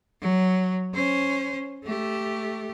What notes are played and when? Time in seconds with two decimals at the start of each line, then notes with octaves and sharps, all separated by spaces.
0.21 F#3
0.94 C#4 C5
1.84 A3 G4